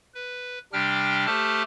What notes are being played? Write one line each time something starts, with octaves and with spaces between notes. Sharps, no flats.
B4
C3 G3 D4 G4 G5 F6
A3 G4 A4 C5 A5 F6